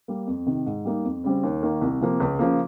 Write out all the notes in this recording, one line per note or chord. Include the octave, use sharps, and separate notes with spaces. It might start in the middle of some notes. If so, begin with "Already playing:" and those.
G3 A#3
F2
C3 D#3
G#2
G3 A#3 D#4
F2
C#3 G3 C4
D#2
D#3 A#3
C2
C3 F3 A#3
C#2
C#3 F3 A#3